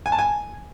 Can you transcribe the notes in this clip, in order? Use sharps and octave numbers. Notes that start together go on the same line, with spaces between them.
G#5
A5
G#5